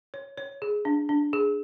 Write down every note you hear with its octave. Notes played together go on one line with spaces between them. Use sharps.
C#5
C#5
G#4
D4
D4
G#4